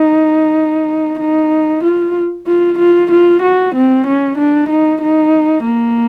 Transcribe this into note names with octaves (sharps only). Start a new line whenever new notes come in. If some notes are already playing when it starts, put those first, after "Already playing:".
Already playing: D#4
D#4
F4
F4
F4
F4
F#4
C4
C#4
D4
D#4
D#4
A#3